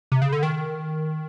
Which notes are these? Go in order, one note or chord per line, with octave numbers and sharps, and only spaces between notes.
C3
C#3
D3
D#3